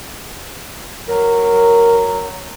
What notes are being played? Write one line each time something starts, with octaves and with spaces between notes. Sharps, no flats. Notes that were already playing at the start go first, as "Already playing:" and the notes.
F#3 A#4